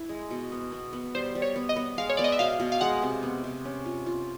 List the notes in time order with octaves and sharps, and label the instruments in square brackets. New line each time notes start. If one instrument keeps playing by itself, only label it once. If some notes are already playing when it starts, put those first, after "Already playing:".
Already playing: [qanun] E4
G#3
B2
B3
B3
B3
[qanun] G3 [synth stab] C5
[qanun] G3
[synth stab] C#5
[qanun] B3
[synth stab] D#5
[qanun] B3
[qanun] G#3 [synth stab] F5
[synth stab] C#5
[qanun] B3 [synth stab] D5
[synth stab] D#5
E5
[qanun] B2 [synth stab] F5
[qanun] B2
[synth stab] F5
[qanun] G#3 [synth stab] F#5
[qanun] C3
B3
C3
C#4
F4
F4